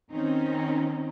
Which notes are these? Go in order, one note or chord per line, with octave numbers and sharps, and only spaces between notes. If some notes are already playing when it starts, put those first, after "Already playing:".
D#3 C4 C#4 D#4